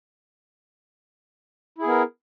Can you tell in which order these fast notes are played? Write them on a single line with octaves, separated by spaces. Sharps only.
E4 G#4 B3 A#4